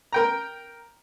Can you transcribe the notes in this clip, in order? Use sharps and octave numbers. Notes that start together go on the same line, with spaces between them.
A#4 G5 A#5